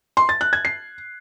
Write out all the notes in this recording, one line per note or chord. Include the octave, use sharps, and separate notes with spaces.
C6
A6
F#6
G#6
C7